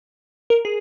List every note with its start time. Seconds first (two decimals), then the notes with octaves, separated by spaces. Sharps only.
0.50 A#4
0.65 G#4